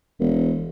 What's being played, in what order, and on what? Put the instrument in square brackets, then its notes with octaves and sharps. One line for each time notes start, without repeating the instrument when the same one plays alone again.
[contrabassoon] E1